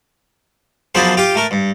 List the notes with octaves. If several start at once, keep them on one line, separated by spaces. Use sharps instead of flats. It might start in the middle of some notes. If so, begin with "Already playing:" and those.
F#2 F3 B3 D4 G#4 C5
F4 G4 G5
A3 A#4
G2